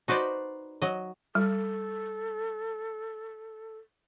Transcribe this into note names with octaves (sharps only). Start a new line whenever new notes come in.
D#4 F#4 B4 C5 D5
F#3 D#5
G3 A4